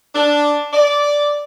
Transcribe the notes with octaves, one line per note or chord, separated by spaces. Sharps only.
D4
D5